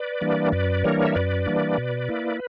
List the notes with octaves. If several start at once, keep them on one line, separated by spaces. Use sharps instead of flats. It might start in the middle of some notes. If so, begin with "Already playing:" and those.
Already playing: B4 D5
E3 G3 A#3 D4
F#2 B4 D5
E3 G3 A#3 D4 A#4 C#5
E5
F#2 B4 D5
E3 G3 A#3 D4
B2
A#3 E4